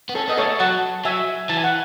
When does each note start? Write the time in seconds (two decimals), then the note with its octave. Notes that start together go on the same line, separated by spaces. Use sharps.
0.09 B3
0.15 C#4 A4
0.28 B3 D#5
0.38 A3 A4 C#5
0.60 F#3 F#5 A5
1.05 F#3 E5 G#5
1.49 E3 A5
1.57 G#5
1.64 F#5